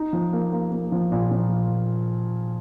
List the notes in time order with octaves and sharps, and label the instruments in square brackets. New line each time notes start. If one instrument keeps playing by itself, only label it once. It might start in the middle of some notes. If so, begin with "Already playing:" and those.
Already playing: [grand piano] D#4
F3
A#3
A#3
A#3
F3
A#2
F3